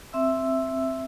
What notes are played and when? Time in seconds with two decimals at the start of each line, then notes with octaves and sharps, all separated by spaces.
0.13 C4 E5 E6